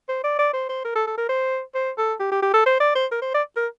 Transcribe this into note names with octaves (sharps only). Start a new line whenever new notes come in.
C5
D5
D5
C5
C5
A#4
A4
A4
A#4
C5
C5
A4
G4
G4
G4
A4
C5
D5
C5
A#4
C5
D5
A#4